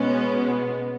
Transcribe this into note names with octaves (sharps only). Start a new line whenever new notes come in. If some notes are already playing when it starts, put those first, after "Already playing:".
Already playing: B2 G#3 B3 C#4